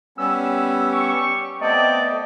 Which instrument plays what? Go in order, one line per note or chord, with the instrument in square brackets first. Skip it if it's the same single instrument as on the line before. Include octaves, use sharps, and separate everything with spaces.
[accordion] G3 B3 C#4 [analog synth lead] E6
[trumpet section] G4 C#6
[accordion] A3 B3 C4 [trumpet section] D5 G5 A5 [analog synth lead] D#5